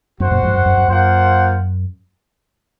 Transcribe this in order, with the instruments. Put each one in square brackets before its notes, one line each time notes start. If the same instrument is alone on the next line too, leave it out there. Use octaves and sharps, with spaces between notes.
[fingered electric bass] F#2 [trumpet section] F#4 C5 F#5
[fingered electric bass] F#2 A#2
F2 G#2
F#2
F#2
F#2
[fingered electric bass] F#2 [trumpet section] A#3 F4 C5 F#5